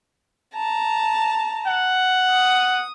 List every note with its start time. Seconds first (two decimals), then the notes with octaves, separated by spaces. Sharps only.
0.55 A5 A#5
1.66 F#5
2.31 D#6